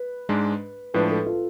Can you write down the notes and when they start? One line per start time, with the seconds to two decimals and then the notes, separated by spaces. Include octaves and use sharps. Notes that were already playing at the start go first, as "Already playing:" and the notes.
Already playing: B4
0.29 G#2 G#3 D4
0.94 A2 F3 G#3 D4 B4
1.10 A4
1.26 F4